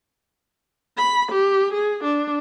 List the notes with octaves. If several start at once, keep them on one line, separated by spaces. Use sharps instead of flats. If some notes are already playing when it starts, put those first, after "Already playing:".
B5
G4
G#4
D4